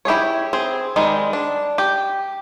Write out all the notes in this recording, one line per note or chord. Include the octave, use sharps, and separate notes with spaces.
E4 G4 G#4 C#5
C4 G#4
D#3 G3 G#3
D4
G4